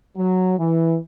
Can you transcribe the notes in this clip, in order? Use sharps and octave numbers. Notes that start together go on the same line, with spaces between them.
F#3
E3